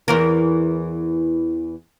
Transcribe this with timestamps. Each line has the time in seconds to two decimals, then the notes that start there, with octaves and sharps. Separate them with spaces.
0.08 E2 E3 A#4